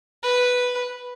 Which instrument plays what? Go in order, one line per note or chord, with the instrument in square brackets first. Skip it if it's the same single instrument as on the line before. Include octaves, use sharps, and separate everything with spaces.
[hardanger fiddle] B4